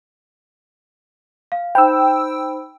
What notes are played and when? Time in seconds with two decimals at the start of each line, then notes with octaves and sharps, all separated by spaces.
1.52 F5
1.75 D#4 C5 G5 B5 E6